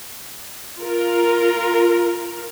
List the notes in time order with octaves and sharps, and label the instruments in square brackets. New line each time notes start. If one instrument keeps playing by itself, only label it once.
[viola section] F4 A#4